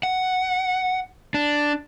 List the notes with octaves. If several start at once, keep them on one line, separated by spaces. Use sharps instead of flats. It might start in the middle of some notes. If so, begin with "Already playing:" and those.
F#5
D4